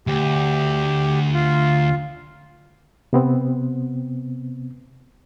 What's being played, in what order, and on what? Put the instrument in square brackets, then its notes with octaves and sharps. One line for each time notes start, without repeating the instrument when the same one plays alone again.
[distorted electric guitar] D2 [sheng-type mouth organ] G4
[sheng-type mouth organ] F4
[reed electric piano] C3 B3 C4